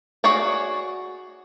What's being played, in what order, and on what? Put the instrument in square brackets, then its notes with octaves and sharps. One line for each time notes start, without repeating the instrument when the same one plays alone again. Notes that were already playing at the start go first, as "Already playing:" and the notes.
[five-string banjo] F#4 G#4 C#5 D5